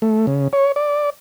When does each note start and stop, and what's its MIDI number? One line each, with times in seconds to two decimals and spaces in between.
0.02 0.26 57
0.27 0.48 49
0.53 0.72 73
0.76 1.10 74